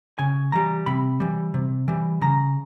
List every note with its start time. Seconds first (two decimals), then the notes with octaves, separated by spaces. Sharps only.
0.19 C#3 G#5
0.52 E3 G3 A#5
0.86 C3 B5
1.20 E3 G3
1.54 C3
1.88 E3 G3
2.21 C#3 A#5